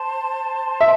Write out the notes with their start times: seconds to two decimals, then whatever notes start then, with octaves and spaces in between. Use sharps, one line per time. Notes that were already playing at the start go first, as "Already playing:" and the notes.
Already playing: C5 A5 C6
0.81 E5